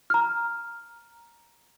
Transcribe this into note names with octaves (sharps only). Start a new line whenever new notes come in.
A#5 F6